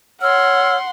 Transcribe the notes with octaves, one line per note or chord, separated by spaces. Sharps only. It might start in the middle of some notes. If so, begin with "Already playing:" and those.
C#5 F#5 C6 E6 F6